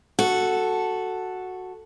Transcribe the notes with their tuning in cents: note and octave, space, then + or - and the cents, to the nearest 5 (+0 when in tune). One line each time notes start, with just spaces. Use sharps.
F#4 +0 A4 +0